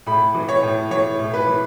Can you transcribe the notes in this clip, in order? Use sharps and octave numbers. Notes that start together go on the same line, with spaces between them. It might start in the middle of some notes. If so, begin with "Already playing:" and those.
A2 B5
E3
C#5
A2
E3 C#5
A2
B4
E3